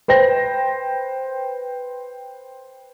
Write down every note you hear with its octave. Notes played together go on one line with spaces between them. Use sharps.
B4 C5 G5 A#6